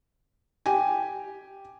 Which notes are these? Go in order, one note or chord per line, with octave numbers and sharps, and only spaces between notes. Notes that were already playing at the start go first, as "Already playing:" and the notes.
G4 G5 G#5